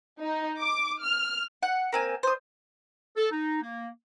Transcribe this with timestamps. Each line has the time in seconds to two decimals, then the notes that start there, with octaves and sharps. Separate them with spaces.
0.21 D#4
0.62 D6
1.05 F6
1.63 F#5
1.93 A#3 C4 G#5
2.23 C5 D#6
3.16 A4
3.31 D#4
3.62 A#3